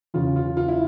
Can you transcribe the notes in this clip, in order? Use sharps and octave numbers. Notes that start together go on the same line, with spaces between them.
E2 C#3 E3 F4
F4
F4
E4